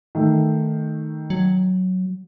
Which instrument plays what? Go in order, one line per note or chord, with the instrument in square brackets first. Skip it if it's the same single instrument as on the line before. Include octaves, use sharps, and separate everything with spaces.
[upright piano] D#3 A3
[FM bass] F#3